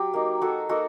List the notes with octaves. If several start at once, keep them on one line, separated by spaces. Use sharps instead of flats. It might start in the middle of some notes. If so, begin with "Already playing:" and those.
Already playing: F#3 G4
A#3 D#4
F#3 F#4 A4
A#3 D#4 F#4 A4